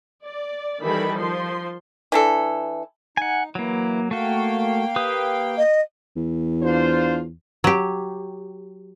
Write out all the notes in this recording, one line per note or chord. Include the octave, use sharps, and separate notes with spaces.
D5
D#3 E3 G3 A4 B5
F3 C6
E3 D4 A4
D#4 F#5 G#5
E3 F#3 A#3 E4
A3 A#3 F#4 F5 G5
G4 B4 D#6
D#5
E2
D4 F4 C5
F#3 G4